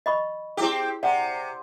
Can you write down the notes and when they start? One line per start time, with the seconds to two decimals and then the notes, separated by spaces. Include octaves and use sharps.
0.06 D#5 B5 C#6
0.57 C4 E4 G4 G#4
1.03 C3 D5 F#5